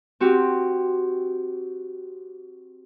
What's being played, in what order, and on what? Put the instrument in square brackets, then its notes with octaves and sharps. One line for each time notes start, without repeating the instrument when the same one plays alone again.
[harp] C4 F#4 G4